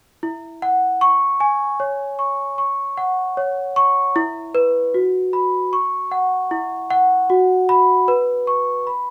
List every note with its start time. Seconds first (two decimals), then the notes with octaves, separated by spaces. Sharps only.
0.23 E4
0.62 F#5
1.01 C#6
1.40 G#5
1.80 C#5
2.19 C#6
2.58 C#6
2.98 F#5
3.37 C#5
3.76 C#6
4.16 E4
4.55 B4
4.94 F#4
5.33 B5
5.73 C#6
6.12 F#5
6.51 E4
6.90 F#5
7.30 F#4
7.69 B5
8.08 B4
8.47 C#6
8.87 B5